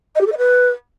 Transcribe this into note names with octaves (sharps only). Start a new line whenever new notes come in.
D#5
G4
A4
D#5
B4